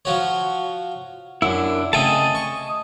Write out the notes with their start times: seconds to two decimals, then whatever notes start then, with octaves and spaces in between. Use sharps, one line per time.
0.05 F3 F#4 C#5
1.42 F#2 D4 E4
1.93 C#3 A3 C4 D#5 G#5 A5
2.35 C#6